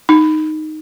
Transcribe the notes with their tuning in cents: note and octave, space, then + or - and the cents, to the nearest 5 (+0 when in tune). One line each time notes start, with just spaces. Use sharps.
D#4 -5